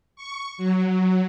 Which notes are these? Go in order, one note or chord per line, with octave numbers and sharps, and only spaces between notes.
C#6
F#3